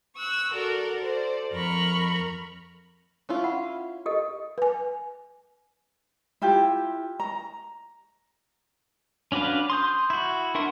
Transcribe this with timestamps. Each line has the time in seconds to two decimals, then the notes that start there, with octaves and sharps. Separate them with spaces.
0.17 C#6 E6 F#6
0.52 F#4 A4 A#4 D5
1.01 A4 C5 D5
1.53 F2 A#4 A#5 B5 C#6 F6
3.29 C#4 E4 F4
3.44 F#5 B5
4.06 G4 A4 D#5
4.58 B4 G#5
6.42 E4 F4 G4
7.20 A#5
9.32 C#4 D4 F#4 B4 F5
9.70 C6 D#6 G6
10.10 E4 F#4
10.55 D4 A#4 E5 F#5 C6